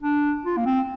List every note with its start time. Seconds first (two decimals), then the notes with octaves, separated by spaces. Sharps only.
0.03 D4
0.45 F4
0.57 A#3
0.66 C4